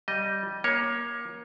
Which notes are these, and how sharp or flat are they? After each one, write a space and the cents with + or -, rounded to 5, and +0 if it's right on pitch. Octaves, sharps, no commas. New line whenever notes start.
G3 -10 D#5 +0
A#3 +25 C#5 +0